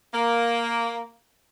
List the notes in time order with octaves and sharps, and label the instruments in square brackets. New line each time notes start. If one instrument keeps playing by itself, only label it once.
[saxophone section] A#3